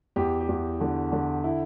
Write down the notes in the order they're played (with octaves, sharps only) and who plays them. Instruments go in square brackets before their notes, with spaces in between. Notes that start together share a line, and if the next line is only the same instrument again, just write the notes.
[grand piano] E2 G4
G4
E2
D3
D3
E4